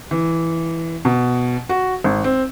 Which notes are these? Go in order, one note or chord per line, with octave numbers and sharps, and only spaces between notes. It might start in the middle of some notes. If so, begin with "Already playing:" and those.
E3
B2
F#4
G#1
C4